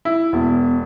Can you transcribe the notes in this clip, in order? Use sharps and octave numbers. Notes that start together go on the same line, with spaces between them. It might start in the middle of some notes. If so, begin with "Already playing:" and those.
E4
E1 B3